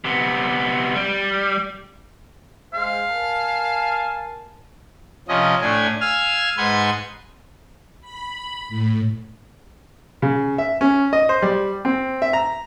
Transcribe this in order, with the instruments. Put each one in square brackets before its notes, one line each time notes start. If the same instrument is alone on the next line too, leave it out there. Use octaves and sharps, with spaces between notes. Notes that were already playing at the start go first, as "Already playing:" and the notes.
[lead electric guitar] C3 B3
G3
[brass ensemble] G#3 C5 [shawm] F5
[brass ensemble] A#4 G#5 A5
[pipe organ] C3 F3 C#4 D#5
A2 A3 D4 G#5
F5 G#5 E6 F6
G#2 B4 F#5 G#5 C6 G#6
[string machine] B5
A2
[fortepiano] C#3
E5
C#4
D#5
C5
G3
C4
E5
A#5